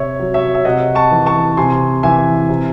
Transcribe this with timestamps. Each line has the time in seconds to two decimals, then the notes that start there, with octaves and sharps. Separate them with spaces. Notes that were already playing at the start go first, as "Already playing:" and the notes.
Already playing: C3 C#5 E5
0.19 F#3
0.34 C#5 E5
0.55 E5
0.65 C3 D#5 F#5
0.95 A5 C#6
1.11 E3
1.26 A5 C#6
1.57 C3 G#5 C6
2.03 E3 E5 G#5
2.49 C3